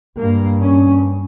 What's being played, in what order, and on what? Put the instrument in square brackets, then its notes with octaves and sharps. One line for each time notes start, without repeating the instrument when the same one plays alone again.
[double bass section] G2 A#3
C#4